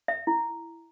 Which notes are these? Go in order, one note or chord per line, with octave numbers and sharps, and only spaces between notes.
E5
E4